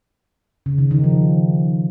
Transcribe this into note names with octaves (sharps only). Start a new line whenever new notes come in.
C#3
D#3
D#3
F3